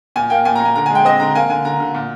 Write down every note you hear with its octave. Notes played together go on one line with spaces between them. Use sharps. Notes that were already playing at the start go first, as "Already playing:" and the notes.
A#2 G#5
A#3 G5
A#2 G#5
A#5
A#2
G#5
D3 A#5
G#5
G#3
G5
C4 D#5
D3 A#5
A#3 G#5
D3 G#5
D3 A#5
D3
A#2